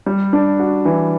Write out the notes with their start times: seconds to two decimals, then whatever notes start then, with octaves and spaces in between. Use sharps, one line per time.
0.06 G3
0.33 D4
0.60 F#4
0.85 E3